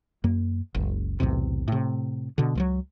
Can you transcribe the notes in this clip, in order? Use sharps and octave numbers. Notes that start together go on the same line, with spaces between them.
F#2 A#3
F#1 C#2
B1 E2 A2 C3
A2 C3
B2 D3
C#2 F3 F#3